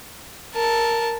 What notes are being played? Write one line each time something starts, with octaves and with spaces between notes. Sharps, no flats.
A#4 A5